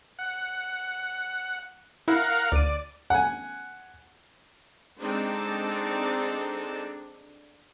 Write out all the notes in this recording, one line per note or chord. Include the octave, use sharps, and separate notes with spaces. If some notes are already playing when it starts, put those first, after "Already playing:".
F#5
E4 A#4 F5 F#5
D2 D5 D#7
F#5 G#5
G#3 C4 D4 D#4 A4